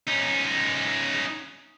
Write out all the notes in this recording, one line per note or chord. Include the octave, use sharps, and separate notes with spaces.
C#4 D#4